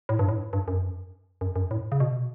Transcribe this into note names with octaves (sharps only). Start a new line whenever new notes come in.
A2
G2
A2
G2
F#2
F#2
F#2
A2
C#3
B2